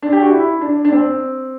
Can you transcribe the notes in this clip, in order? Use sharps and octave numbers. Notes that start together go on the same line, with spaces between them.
D4
G4
F#4
E4
D4
D4
C4